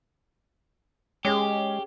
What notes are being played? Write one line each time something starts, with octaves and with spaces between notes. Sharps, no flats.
G#3 C#4 G4 G#4